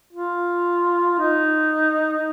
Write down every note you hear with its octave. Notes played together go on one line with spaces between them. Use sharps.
F4
D#4